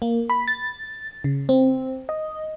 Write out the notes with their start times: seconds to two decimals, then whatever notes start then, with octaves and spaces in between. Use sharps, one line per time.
0.02 A#3
0.30 B5
0.48 A6
1.24 C#3
1.49 C4
2.09 D#5